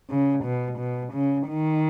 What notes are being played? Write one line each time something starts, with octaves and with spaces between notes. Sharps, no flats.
C#3
B2
B2
C#3
D#3